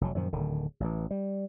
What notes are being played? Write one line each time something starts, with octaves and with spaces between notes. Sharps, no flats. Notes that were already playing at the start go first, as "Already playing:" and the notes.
F1 C3 F#3
F#2 A#2 D#3 F3
D1 D3 D#3
A1 E3
G3